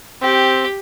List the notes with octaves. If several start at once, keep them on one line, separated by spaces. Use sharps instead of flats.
C4 G4